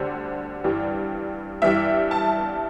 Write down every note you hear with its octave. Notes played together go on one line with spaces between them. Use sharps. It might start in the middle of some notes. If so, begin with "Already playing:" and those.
Already playing: D2 D3 G3 C5
G2 E3 G3
G2 E3 G3 E5
A5